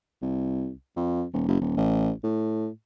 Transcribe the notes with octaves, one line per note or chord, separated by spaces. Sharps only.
C2
F2
D#1
F#1
D#1
A1
A2